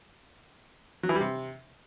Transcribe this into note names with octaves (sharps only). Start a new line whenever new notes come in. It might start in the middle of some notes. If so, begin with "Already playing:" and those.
F#3
E3
G3
C3